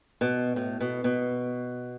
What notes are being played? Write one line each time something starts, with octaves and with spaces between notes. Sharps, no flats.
B2
A2
B2
B2